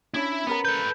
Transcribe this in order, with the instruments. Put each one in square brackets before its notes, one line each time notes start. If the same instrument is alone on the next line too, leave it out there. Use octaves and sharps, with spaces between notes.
[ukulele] C#4 D4 [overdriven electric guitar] E4 [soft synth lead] B5
[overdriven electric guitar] B3 [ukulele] C#4 A#4 A#5
[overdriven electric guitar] A4 B4 [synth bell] G6